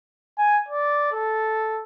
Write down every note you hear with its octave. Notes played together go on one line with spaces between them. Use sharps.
G#5
D5
A4